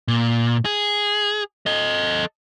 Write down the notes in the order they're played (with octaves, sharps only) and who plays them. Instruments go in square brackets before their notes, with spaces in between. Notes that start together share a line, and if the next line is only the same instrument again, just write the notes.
[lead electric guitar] A#2
G#4
A4 D#5